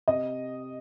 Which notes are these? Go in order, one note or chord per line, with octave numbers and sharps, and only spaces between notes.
C3 D#5